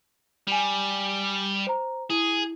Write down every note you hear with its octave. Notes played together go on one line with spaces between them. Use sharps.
G3 G#5 F7
C5 A#5
E4 G#4